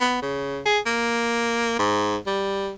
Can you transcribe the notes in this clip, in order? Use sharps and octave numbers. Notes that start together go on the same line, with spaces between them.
B3
C#3
G#4
A#3
G#2
G3